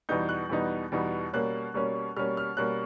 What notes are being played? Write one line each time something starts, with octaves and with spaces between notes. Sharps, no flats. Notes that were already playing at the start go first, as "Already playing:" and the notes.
E2 B2 G3 B3 D#4 G6
F#6
E2 B2 G3 B3 D#4
E2 B2 G3 B3 D#4
B2 G3 A#3 C#4 F#6
B2 G3 A#3 C#4
B2 G3 A#3 C#4 F6
F6
B2 G3 A#3 C#4 F#6